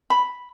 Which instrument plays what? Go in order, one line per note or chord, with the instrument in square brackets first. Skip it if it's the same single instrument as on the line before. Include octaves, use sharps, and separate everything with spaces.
[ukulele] B5